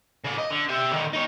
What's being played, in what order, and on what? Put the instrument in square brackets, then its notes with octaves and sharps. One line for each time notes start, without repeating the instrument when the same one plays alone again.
[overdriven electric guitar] C#3 D5
D#5
D3
G4 E5
D3 D#3
D#4 C#5